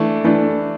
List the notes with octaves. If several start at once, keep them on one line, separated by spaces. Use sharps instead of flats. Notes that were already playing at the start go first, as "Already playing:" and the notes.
Already playing: E3 A3 D4
E3 A3 D4